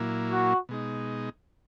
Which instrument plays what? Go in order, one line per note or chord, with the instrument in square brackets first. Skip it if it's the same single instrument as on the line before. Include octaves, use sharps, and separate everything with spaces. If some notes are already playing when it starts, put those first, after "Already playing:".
Already playing: [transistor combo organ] A#2 F#3 A#3 E4
[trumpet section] F#4
[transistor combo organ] B2 G#3 D#4